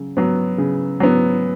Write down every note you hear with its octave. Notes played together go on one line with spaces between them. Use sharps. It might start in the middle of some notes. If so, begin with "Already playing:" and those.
Already playing: C#3 F#3
F#3 B3
C#3
F#3 B3